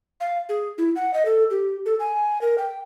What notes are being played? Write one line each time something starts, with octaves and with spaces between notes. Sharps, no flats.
F5
G#4
E4
F#5
D#5
A4
G4
A4
G#5
A#4
G5